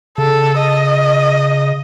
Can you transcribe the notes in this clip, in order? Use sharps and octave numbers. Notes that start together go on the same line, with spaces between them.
C#3 A4
D#5